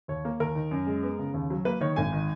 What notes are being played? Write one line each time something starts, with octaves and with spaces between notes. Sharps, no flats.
D#2 C#5
A#3
D#2 A#4
D#3
F#2
G#3
B3
C#3
D#2
F#3
A#3 B4
D#3 C#5
G#1 G#5
D#3